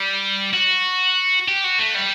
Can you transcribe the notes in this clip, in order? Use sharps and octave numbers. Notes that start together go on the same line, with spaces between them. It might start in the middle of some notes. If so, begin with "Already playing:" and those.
Already playing: G3
F#4
G4
F#4
A3
G3